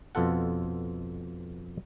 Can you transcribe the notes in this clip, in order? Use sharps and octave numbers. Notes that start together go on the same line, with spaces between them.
F2 B2 F4 A4 F#5